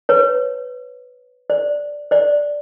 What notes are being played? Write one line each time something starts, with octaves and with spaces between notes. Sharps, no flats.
B4 C#5
C5 D5
C5 D5